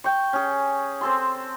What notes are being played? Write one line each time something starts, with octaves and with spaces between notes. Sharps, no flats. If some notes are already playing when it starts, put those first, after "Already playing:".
G5 C#6
C#4 G#4
C4 A4 C6